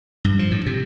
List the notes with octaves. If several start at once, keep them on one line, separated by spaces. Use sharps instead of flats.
G2
F3
A2
C3